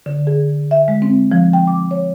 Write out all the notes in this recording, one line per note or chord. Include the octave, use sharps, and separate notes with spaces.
D3
G#4
E5
G#3
C4
F3
G5
D6
C#5